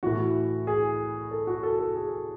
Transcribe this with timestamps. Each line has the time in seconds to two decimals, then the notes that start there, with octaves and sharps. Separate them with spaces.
0.03 A2 E3 F#4
0.67 G#4
1.31 A4
1.47 F#4
1.63 A4
1.79 A4
1.95 G#4